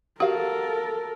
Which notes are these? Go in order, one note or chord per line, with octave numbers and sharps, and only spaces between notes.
F#4 G4 A4 A#4 F5